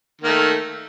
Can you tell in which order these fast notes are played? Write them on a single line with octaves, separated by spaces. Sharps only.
D#3 A#3 A3